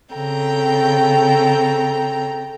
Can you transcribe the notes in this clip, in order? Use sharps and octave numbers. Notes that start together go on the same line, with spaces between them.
C#3 C4 A4 G5 A#5